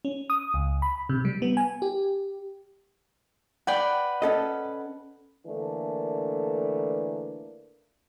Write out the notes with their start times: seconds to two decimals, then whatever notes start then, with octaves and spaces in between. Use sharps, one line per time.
0.05 C#4
0.30 D#6
0.54 C#2
0.82 B5
1.09 C3
1.25 G3
1.42 B3
1.57 G#5
1.82 G4
3.67 B4 D5 F#5 G5
4.22 C#4 A4 D#5
5.46 D3 E3 A3 A#3 D4